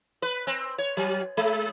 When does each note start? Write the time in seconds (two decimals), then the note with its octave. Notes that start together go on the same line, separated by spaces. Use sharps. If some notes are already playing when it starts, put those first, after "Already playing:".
0.22 B4
0.47 C4
0.78 C#5
0.97 F#3
1.37 G#3